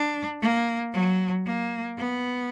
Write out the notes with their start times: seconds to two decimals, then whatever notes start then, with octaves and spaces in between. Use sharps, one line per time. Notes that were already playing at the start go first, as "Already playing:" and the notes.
Already playing: D4
0.41 A#3
0.93 F#3
1.46 A#3
1.98 B3